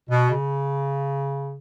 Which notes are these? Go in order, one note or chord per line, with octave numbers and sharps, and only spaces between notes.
B2
C#3